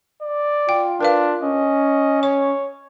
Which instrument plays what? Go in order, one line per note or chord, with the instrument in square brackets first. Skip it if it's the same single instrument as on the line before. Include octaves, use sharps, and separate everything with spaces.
[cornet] D5
[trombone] F4 [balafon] G5
[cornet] D4 [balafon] A#4 B4 F5
[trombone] C#4 [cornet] D#5
[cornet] C#5 [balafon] C#6